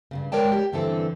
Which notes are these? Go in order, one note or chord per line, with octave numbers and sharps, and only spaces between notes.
G2 A#2 C#3
G#3 A#4 C#5 D5 G5 A5
G4
G2 D3 E3 C4 A4